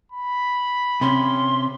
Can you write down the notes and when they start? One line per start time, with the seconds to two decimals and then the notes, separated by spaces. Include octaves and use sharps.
0.12 B5
1.01 C3 C#4 C6